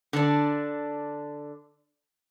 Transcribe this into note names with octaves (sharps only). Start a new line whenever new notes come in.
D3 D4